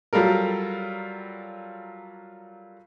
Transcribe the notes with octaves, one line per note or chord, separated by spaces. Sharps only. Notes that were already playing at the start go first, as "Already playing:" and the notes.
F#3 G3 F4 A4 A#4